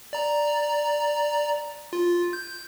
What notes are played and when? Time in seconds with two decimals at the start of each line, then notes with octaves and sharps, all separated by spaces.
0.13 D5 A#5
1.93 F4
2.33 G6